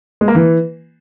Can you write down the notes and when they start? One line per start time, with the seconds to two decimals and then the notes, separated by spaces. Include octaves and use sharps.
0.21 G#3
0.28 A#3
0.35 E3